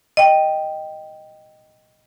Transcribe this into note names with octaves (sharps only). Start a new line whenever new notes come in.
D#5 G5